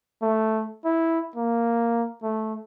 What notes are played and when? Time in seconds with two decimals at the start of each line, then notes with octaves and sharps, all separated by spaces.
0.22 A3
0.85 E4
1.36 A#3
2.23 A3